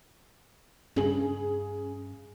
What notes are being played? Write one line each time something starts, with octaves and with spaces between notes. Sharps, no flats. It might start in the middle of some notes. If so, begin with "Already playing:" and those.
G2 C#3 G#4 F#7